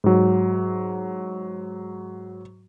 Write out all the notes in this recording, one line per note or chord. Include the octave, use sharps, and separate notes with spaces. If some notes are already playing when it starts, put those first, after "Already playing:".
G#2 F#3